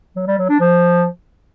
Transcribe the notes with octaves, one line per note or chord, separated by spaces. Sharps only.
F#3
G3
F#3
D4
F3